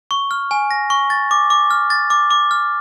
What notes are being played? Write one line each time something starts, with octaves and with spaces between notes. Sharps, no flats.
C#6
F6
G#5
A#6
C#6
A6
D6
D6
F6
A6
D6
D6
F6